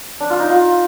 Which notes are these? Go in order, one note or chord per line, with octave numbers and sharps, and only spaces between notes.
D4
F4
D#4
F4